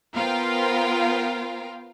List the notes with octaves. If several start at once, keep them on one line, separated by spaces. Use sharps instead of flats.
B3 F4 A#4 C5 F5 G5